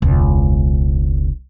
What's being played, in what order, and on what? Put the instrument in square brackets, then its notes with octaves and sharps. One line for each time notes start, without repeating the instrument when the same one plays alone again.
[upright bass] E1 C#2